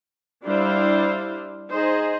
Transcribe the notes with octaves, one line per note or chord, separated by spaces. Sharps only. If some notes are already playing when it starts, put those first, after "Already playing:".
G3 D4 E4 C5 F5
D#4 G#4 C5 D#5